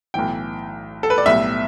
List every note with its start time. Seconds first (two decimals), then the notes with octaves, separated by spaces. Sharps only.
0.14 B1 A2 E3 G5
1.03 A4
1.10 B4
1.18 D5
1.26 B1 A2 G3 B3 E5